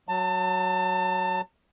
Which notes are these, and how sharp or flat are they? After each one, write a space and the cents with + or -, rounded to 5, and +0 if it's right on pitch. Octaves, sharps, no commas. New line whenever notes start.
F#3 +0 A5 +30